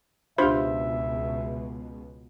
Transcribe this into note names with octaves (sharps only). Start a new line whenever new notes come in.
C#2 B2 D4 F4 G4 C5 E5 B5